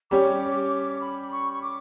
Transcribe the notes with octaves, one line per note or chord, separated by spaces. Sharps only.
G3 C#4 G4 C#5 D6
B5
C#6
C#6
D6